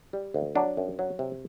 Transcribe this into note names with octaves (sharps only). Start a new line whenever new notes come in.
G3
D2
F#3 D4
F#2
F#3
C3